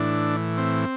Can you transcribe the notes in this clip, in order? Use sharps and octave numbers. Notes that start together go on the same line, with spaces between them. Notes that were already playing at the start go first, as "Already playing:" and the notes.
Already playing: A2 E3 D4
C4